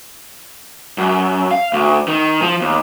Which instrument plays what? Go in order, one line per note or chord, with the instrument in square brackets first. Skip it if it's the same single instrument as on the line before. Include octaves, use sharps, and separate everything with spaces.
[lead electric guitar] F#2
F5
D2
D#3
F3
D#2